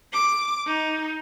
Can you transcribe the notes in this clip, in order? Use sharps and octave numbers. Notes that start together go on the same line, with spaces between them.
D6
D#4